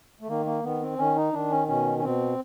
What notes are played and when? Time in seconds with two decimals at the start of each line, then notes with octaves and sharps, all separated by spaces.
0.21 A3
0.28 D#3 A#3
0.46 A#3
0.64 D#3 B3
0.81 C4
0.98 D#3 C#4
1.16 D#4
1.33 D#3 D4
1.51 C#4
1.68 B2 C#4
1.99 C#4
2.04 B2 C4